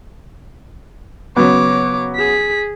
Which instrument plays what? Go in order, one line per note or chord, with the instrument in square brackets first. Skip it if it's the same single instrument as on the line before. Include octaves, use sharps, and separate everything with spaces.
[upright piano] C#3 F#3 B3 [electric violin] C#5 D6
[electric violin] G#4 B6